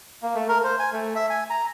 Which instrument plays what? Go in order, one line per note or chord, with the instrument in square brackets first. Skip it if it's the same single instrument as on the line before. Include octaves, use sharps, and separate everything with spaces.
[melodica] A#3
A3
A#4
C5
G#5
A3
E5
G#5
A#5